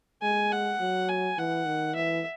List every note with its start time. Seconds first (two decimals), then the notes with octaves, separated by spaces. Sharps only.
0.22 G#3 G#5
0.52 F#5
0.80 F#3
1.09 G#5
1.38 E3 F#5
1.67 D#3
1.96 E3 E5